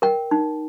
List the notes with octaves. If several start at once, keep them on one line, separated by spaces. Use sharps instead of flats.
A#4 G5
D#4